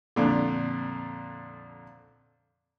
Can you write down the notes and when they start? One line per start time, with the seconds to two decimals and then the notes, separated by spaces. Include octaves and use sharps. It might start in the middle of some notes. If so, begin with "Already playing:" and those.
0.16 F2 A#2 D3